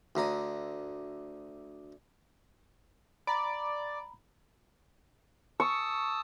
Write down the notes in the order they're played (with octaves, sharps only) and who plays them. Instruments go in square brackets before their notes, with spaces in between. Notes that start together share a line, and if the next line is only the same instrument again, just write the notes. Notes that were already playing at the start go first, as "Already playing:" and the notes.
[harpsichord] D2 D3 A#5 D#6
[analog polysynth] D5 [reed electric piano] A#5 B5
[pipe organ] A5 D#6 E6 [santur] C#6